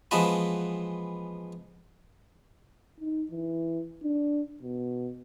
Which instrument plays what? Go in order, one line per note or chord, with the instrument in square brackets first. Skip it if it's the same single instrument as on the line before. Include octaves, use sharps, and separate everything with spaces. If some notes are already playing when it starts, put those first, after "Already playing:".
[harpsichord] E3 F3 G#3 B3 B4
[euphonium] D#4
E3
D4
B2